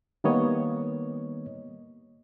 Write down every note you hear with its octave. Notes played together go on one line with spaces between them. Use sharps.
D#3 G3 A#3 B3 C#5 D#5